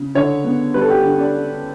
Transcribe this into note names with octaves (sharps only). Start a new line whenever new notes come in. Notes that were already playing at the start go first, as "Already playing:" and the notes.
Already playing: C#3
D3 C#5
B3
G3 B4
A4
G4
D3
D4